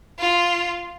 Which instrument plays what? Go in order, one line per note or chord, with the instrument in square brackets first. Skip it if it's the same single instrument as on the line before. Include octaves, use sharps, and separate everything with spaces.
[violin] F4